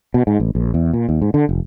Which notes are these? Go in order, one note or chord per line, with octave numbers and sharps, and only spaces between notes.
B2
G#2
A1
A#1
E2
A#2
D#2
G#2
D3
F1